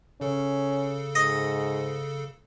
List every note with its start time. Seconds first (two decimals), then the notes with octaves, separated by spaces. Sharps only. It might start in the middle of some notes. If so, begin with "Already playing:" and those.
0.21 C#3 C#4 A4
1.15 G#2 D#5